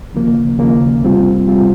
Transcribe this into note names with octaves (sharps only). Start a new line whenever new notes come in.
D#2 C#3 F3 A#3
D#2 C#3 F3 A#3
F2 C3 G3 C4 F4
F2 C3 G3 C4 F4